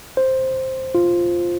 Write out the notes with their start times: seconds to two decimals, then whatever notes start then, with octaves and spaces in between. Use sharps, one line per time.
0.17 C5
0.95 F4